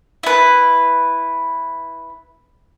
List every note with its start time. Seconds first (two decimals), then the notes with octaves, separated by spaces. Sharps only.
0.23 E4 B4